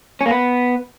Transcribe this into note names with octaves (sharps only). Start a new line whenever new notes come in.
C#4
A#3
B3